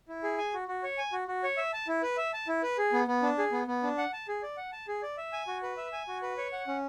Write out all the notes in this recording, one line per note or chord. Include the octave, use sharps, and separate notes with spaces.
E4
G#4
G#5
F#4
F#4
C#5
G#5
F#4
F#4
C#5
E5
A5
E4
B4
E5
A5
E4
B4
G#4
B3
B3
D4
G#4
B3
B3
D4
F#5
A5
G#4
D5
F#5
A5
G#4
D5
E5
G#5
F#4
B4
E5
G#5
F#4
B4
C#5
F#5
C#4